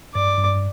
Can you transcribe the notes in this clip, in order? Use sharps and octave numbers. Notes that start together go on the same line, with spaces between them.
G2 D5
G2